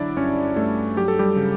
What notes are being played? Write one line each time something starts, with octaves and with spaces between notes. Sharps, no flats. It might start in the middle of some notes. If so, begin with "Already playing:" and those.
Already playing: D3 F#3 D4 E4 D5
G2 C#4 C#5
G2 A3 A4
F#3 G4
A4
G3 G4
C#3